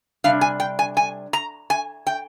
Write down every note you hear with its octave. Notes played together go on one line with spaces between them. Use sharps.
C3 G3 D4 F5
G#5
G5
G#5
G#5
A#5
G#5
G5